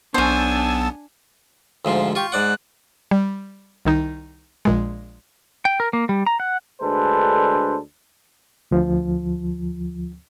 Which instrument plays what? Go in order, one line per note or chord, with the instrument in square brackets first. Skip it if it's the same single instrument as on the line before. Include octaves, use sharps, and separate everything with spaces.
[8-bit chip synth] B1 B3 [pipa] C#4 C5 [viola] D4 G#5 [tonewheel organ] A5 E6
[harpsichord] D2 G#2 F3 [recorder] F5
[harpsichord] F4 C#6 [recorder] G4
[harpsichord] G#2 D5 F#5 [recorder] F#6
[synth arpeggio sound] G3
C2 D#3 D#4
A#1 A#2 G#3
[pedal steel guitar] G5
A#4
A#3
G3
A#5
F#5
[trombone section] D2 G#3 D4 A4 B4 C5
[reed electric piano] D2 F3